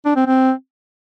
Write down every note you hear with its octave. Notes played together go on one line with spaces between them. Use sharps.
D4
C4
C4